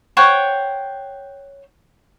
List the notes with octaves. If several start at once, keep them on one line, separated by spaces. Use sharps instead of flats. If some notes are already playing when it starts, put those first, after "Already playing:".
C5 C#5 F#5 G5